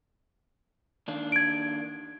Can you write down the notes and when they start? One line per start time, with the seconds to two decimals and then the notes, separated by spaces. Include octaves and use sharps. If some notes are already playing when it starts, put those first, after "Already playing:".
1.08 D#3 A#3 D4
1.32 G#6 D7